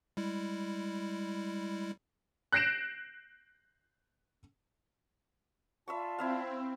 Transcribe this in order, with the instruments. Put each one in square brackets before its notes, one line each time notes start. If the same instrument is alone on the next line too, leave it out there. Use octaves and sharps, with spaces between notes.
[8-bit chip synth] G3 G#3 E4
[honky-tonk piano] F#6 G6 A#6 C7 D7 E7
[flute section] F4 D5 A5 [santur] E5 B5 C#6
[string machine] C4 [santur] E4 E5 F5